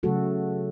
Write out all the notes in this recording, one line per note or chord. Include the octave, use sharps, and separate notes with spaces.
C#3 F#3 A3 F#4 A4